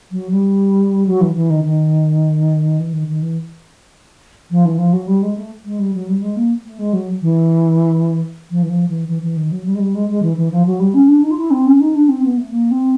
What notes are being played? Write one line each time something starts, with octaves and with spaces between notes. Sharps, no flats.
F#3
G3
F#3
E3
E3
D#3
D#3
E3
D#3
D#3
E3
F3
E3
F3
F#3
G3
G#3
A3
G#3
G3
F#3
G3
G#3
A#3
A3
G#3
F#3
E3
F3
E3
F3
E3
E3
E3
D#3
F#3
G3
G#3
G3
G#3
G#3
E3
E3
F3
F#3
G3
C#4
D4
D#4
F4
E4
C4
C#4
D#4
D4
C4
B3
A3
A#3
C4